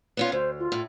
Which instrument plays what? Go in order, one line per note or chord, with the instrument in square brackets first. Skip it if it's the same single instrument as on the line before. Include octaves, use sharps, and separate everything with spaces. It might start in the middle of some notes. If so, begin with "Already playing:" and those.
[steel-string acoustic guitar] B3 C#4 F4
[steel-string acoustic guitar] D2 [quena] C5
[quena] F4
[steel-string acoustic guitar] A2